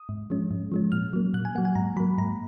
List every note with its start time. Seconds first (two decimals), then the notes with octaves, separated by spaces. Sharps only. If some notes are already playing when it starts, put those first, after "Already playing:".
Already playing: D#6
0.09 G#2
0.30 F3 G#3 C#4
0.51 G#2
0.72 F3 G#3 C#4
0.92 A#2 F6
1.13 F#3 A#3
1.34 A#2 F#6
1.45 G#5
1.55 F#3 A#3 F#5
1.65 G#5
1.75 G#2 A#5
1.96 F#3 A#3 B5
2.18 G#2 A#5